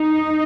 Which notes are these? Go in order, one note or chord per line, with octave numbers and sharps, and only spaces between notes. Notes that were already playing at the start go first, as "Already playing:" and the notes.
Already playing: D#4